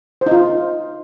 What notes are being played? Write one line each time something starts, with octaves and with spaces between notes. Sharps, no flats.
C5
D#4
F4